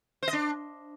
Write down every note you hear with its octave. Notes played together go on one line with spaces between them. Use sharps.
C5
D#5
D4